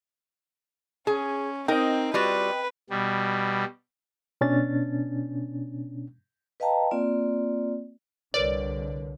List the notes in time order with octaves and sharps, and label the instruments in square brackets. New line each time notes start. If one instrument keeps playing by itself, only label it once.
[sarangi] C#4 [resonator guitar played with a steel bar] G#4
[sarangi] C4 [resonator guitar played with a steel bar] D#4 A#4 [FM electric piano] D#5 G5
[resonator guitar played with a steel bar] G3 F4 F#4 [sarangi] B4
[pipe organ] B2 G3
[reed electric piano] B2 B3 C#4 D4 A6
[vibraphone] B4 D#5 F5 G5 A5 A#5
A#3 C4 F4 D5
[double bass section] C2 D3 [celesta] A#4 B4 C#5 [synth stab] D5